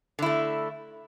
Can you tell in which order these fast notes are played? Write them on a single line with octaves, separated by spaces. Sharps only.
D3 E4 A3